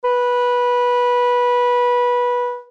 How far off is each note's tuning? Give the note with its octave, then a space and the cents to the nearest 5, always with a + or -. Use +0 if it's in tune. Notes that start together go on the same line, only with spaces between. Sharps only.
B4 -15